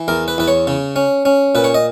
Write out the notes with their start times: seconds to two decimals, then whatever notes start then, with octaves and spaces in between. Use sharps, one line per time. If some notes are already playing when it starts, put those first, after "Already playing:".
Already playing: E3
0.08 E2 A#4
0.28 B4
0.38 E2 B4
0.48 C#5
0.67 C#3
0.96 C#4
1.25 C#4
1.55 A#2 B4
1.64 C#5
1.74 D#5